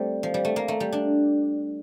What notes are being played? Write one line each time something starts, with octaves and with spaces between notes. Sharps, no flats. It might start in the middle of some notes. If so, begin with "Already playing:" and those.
Already playing: G3 A3 C4
F3
G3
A3
A#3
A3
G3
D4